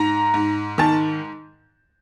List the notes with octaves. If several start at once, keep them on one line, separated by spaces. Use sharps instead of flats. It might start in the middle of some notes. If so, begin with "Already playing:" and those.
Already playing: G#2 A#5
G#2
D#3 A5